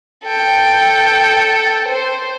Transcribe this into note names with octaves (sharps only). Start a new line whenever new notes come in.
A4 G5
C5